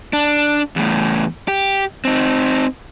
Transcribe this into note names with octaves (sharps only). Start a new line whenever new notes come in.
D4
E2 A2
G4
C4 D#4